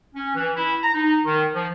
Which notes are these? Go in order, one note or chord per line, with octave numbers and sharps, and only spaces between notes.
C#4
E3
E4
A#5
D#4
D#3
F3